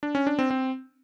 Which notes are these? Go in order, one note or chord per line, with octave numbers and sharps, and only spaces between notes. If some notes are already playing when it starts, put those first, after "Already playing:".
D4
C#4
D4
C4
C4